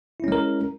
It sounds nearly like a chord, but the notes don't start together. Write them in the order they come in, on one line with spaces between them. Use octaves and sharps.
E4 C#4 G#3 A#4